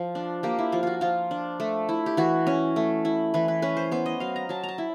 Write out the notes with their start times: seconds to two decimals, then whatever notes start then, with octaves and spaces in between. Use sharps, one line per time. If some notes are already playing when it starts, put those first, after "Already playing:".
Already playing: F3
0.15 D4
0.43 A#3 G4
0.59 E4
0.72 F3 F4
0.83 F4 F#4
1.01 F3 F4
1.31 D4
1.60 A3
1.89 E4
2.06 G4
2.17 E3 F#4
2.47 C#4
2.76 A3
3.05 E4
3.34 E3 B4
3.48 B4
3.62 C#4 B4
3.77 C5
3.91 B3 C5
4.06 D#5
4.20 F#3 F5
4.36 A#5
4.49 F#3 A5
4.63 A#5
4.68 A5
4.78 E4